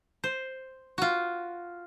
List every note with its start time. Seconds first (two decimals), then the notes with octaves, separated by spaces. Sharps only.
0.24 C5
0.98 F4 F#4